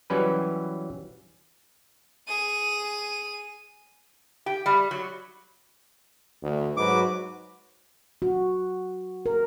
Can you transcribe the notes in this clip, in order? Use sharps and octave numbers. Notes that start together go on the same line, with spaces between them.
E3 F#3 G3 C#4 B4
G#4 D#7
G4
G3
F#3
D2
G#2 F#3 F#4 B4 D6
F#4
A#4